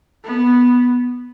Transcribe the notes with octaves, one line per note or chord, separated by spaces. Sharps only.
B3